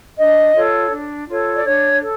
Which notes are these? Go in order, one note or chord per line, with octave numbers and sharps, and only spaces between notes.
D4 D#5
F4 A4 C#5
D4
F4 A4 C#5
D5
D4 C#5
A4